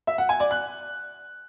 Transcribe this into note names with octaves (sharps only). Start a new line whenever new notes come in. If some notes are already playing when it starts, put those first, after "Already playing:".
E5
F#5
G#5
D5
F#6